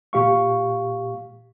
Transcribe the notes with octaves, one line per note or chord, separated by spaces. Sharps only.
A#2 G4 F5 C#6